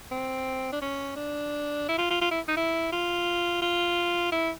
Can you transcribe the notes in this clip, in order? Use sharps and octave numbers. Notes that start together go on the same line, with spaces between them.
C4
D4
C#4
D4
E4
F4
F4
F4
E4
D#4
E4
F4
F4
E4